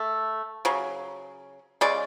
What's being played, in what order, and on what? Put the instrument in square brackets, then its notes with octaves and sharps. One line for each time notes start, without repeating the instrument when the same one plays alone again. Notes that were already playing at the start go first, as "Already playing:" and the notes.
Already playing: [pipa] A3
C#3 F#3
C#3 G#3 D5